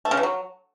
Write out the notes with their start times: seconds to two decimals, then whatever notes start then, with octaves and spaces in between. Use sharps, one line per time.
0.05 A3
0.11 C#3
0.17 E3
0.23 F#3